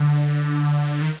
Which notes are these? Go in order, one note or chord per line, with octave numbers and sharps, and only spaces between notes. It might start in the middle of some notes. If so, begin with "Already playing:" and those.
Already playing: D3
D#3